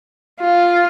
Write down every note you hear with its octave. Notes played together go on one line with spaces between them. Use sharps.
F4